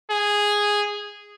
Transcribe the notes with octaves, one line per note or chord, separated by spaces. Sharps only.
G#4